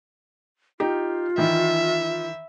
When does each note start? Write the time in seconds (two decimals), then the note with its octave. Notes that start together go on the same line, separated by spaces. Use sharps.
0.80 D#4 F4 G4
1.38 D#3 E3 E5